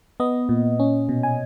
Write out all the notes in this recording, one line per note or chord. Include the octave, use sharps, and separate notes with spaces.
B3 D#5
A#2
C#4
B2
G#5